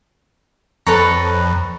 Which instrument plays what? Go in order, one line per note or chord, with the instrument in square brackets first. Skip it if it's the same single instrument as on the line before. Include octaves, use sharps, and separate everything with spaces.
[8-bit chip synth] F2 [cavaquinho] A4 B4 C#5 [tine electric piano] A#5